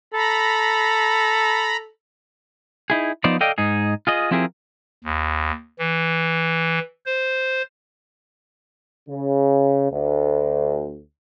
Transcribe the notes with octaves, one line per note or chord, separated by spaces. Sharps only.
A4 A#5 B5
D#4 E4 G#4
F3 B3 D#4 C5 D5
A4 D5 D#5 F5 G5
G#2 D#4 G#4
F4 G#4 D#5
F3 C4 E4 G4 G#4 A#4
D#2
E3
C5
C#3
D2